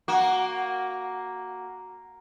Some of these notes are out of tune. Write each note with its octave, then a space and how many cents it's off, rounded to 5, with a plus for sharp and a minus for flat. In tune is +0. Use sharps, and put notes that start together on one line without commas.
A#3 +0 F#4 +0